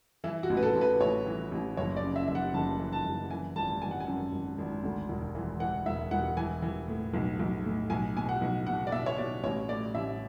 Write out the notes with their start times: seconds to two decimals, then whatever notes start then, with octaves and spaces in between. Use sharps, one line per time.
0.24 E3 E4
0.43 F#4
0.50 A1
0.57 B4
0.63 A4
0.75 A1
0.81 B4
1.01 A1 C#5
1.26 E3
1.51 A1
1.77 F#1 C#5
1.96 D5
2.03 C#3
2.16 E5
2.28 F#1 E5
2.35 F#5
2.54 F#1 A5
2.79 E3
2.92 A5
3.05 F#1
3.30 E3 G#5
3.56 G#1 A5
3.82 G#1 G#5
3.91 F#5
4.00 G#5
4.07 F#2
4.33 G#1
4.58 G#1
4.84 D2
5.09 E1
5.35 E3
5.60 E3 F#5
5.86 E1 E5
6.11 E1 F#5
6.37 E3 G#5
6.62 E3
6.88 A2
7.13 B1
7.39 B1
7.64 A2
7.90 B1 G#5
8.16 B2 G#5
8.29 F#5
8.41 B1
8.66 B2 F#5
8.87 D5
8.92 B2 E5
9.06 C#5
9.18 B2 D5
9.44 A1 C#5
9.68 A2 D5
9.94 A1 E5